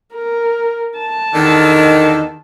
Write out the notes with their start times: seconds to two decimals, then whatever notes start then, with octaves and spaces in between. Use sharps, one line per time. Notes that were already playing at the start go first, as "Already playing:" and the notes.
0.14 A#4
0.99 A5
1.34 E2 D3 D#3